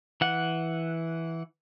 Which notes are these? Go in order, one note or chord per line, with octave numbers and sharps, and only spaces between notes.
E3 F#5